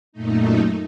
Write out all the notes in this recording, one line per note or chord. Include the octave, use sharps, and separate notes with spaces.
F#2 A#2 A3 D#4